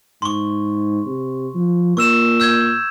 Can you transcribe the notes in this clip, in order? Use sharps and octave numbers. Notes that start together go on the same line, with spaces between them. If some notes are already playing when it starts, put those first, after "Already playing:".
G#2 C6 C#6
C3
F3
A#2 C#6 E6 E7
E6 G6 G#6